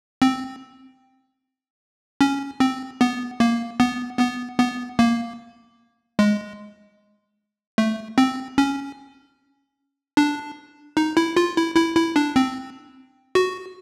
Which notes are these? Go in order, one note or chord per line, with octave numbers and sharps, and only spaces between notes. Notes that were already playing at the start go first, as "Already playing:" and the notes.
C4
C#4
C4
B3
A#3
B3
B3
B3
A#3
G#3
A3
C4
C#4
D4
D#4
E4
F4
E4
E4
E4
D4
C4
F#4